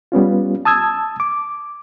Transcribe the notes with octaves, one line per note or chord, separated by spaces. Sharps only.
G3 B3 C#4 F4
A5 D#6 E6 G#6
D6